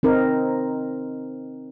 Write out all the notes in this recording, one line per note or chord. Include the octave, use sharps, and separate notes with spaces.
C4 D#4 A#4